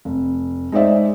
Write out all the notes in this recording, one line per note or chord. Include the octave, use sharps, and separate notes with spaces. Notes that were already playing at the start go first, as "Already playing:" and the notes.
F1
G#3 D#4 C5 D5 E5